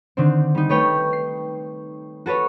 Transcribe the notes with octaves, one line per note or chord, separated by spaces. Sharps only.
D3 D#3 C4
G3 D#4
A3 B4 C#5 G5
C7
F#4 A4 B4 C#5